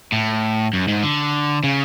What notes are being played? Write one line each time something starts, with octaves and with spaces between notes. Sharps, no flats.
A2
F#2
G#2
D3
C#3